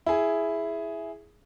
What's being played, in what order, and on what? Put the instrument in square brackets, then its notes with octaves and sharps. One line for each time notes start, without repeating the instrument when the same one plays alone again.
[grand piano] E4 G#4